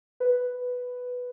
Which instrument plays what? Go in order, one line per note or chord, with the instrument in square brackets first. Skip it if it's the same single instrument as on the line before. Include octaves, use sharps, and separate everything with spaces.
[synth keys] B4